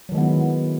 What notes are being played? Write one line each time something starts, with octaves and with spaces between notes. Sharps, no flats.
D#3 F#3 G#3 B3 E4